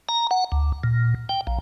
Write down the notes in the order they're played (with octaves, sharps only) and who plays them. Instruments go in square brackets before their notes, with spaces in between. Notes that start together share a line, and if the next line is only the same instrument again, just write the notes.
[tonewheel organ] A#5
F#5
D2
A#2
G5
A#1